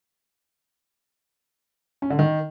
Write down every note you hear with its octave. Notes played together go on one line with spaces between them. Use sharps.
C#4
D3
D#3